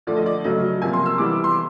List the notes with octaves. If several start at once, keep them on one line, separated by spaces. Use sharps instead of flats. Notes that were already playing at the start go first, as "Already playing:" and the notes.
D3 F3 A3 D5
D#5
D5
C#3 F#3 A3 D#5
C3 F3 A#3 G#5
C6
E6
E3 G3 B3 D6
C6